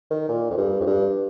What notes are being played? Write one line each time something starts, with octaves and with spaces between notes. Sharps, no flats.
D#3
A#2
F2
G2
F2
G2